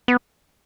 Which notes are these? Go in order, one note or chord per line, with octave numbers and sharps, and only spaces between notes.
B3